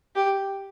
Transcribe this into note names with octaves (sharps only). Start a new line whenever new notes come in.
G4